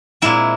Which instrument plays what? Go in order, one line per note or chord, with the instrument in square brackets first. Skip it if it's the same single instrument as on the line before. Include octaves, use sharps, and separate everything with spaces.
[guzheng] A#2 G#3 C4 E4